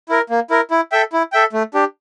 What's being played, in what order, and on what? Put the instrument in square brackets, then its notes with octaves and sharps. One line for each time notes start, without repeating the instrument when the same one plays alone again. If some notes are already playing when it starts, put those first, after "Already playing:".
[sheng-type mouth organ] E4 A#4
A#3
E4 A#4
E4
A4 E5 G5
E4
A4 E5 G5
A3
D4 G4